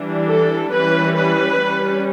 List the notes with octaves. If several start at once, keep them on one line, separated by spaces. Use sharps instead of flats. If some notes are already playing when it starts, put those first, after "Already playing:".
Already playing: E3 G3 D4
A4
E3 G3 C#4 B4
B4
G3 C#4